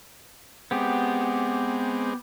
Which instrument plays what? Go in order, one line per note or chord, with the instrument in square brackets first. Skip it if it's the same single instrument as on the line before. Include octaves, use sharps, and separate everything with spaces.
[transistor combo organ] G#3 C4 [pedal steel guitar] B3 G4